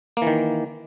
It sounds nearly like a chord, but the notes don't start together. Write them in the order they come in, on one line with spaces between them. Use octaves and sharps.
A#3 E3 D#3